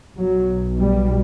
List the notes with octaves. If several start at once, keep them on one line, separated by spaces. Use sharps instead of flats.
B1 B2 F#3
G3